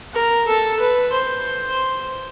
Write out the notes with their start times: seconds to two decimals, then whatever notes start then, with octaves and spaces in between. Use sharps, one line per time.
0.13 A#4
0.47 A4
0.79 B4
1.12 C5